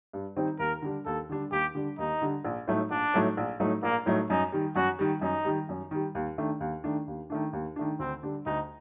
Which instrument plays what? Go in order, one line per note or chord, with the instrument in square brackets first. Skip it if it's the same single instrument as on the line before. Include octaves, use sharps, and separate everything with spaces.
[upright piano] G2
D#3 G3 C4 D#4
[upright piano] D#2 [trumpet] A#4
[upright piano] D3 G3 D4
[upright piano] D#2 [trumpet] A4
[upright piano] D3 G3 D4
[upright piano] D#2 [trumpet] G4
[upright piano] D3 G3 D4
[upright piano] D#2 [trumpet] D#4
[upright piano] D3 G3 D4
A#1
A2 F#3 A3 D#4
[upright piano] A#1 [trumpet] D4
[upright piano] A2 F#3 A3 D#4
A#1
A2 F#3 A3 D#4
[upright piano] A#1 [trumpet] A#3
[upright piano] A2 F#3 A3 D#4
[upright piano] F#2 [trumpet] D#4
[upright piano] D#3 G3
[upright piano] F#2 [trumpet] F#4
[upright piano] D#3 G3
[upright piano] F#2 [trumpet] D#4
[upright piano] D#3 G3
F#2
D#3 G3
D#2
D#3 A3 D4
D#2
D#3 A3 D4
D#2
D#3 A3 D4
D#2
D#3 A3 D4
[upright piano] D2 [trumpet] C4
[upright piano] D3 G3 D4
[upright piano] D2 [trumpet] D#4